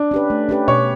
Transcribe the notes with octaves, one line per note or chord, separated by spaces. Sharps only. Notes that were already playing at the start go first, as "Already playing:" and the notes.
Already playing: D4
C#4 G4 B4
A3
C#4 G4 B4
B2 C#5